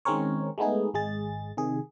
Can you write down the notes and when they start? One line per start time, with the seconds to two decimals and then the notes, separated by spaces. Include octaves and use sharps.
0.05 D#3 G#3 C4 C#4 A#4 C#5
0.58 G#3 A3 B3 D#4 G#4
0.94 G#1 G#3 G#4 A6
1.57 C3 D#3 G#4